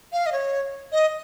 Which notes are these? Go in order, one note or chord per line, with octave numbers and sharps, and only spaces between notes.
F5
D#5
C#5
D#5